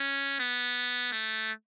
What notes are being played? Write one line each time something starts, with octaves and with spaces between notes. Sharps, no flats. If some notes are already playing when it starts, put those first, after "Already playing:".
Already playing: C#4
B3
A3